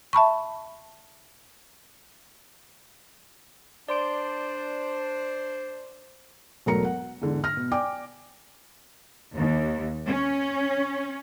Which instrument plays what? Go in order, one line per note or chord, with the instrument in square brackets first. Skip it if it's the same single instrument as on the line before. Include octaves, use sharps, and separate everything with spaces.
[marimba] E5 A5 B5 C#6
[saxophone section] D4 C5 [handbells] D5 C6 D7
[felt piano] E1 F#3 A3 A#4 A#5 C#7
F#5
E2 G#2 D3
F6 A#6
B2
D5 G5 G#5 D6
[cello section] D#2
C#4